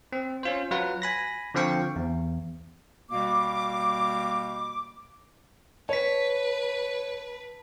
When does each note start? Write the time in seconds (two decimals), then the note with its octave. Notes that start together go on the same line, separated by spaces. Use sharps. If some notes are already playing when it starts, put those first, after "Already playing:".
0.12 C4
0.43 C#4 F4 C5
0.71 F#3 F4 B4 F#5
1.02 G#5 B5 A#6
1.54 D3 F3 C4 F5 G5 C#6
1.96 E2
3.11 B2 G3 A#3 D6
5.89 B4 C#5 A5 B6